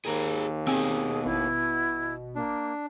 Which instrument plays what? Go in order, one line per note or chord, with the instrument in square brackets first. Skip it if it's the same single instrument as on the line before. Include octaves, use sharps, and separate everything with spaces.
[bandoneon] D#2 [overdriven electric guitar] G#4 A#4
[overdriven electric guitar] B2 G#5 [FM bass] C4 [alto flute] G#4
[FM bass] G#1 [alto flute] E4
[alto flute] A#3 [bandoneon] D4